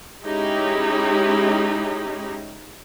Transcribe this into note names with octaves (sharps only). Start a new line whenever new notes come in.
G#3 C#4 D#4 E4 G4